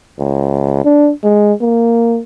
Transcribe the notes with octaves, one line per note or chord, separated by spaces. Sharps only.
C#2
D4
G#3
A#3